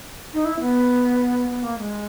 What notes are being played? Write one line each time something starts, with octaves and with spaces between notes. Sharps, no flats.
D#4
E4
B3
B3
A#3
G#3